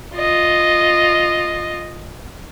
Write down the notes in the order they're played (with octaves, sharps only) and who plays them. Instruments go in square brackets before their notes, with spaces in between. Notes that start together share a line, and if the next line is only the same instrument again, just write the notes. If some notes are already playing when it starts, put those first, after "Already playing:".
[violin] F4 D#5